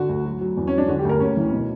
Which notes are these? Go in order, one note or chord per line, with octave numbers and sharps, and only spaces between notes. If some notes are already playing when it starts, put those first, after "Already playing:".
Already playing: D3 F#4
D2
F#3
F#3
E2
C#4
F#3
D4
D3 F#4
G4
D2 A#4
D2 C#4
E3
B2